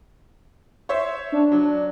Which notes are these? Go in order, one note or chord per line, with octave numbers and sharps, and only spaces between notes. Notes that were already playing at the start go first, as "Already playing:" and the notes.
C5 C#5 E5
D4
F#3